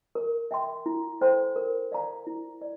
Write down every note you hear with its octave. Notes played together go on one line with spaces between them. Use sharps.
A#4
E5 G5 C6
E4
A4 C5 G5 C6
A#4
D5 F5 A#5
E4
D5